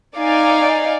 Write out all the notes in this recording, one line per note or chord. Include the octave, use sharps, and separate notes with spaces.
D#4 D5 F5 G#5